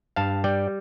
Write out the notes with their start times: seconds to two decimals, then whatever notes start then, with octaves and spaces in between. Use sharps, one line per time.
0.16 G2 F5 A5
0.44 G3 D5 G5